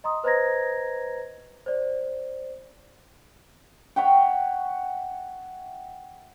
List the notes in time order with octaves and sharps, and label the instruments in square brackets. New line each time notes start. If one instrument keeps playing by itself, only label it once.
[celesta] D#5 A#5 C6 D#6
B4 C5 D#5 A#5 G#6 A#6
C5 D5
[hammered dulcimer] C#5 E5 F#5 G5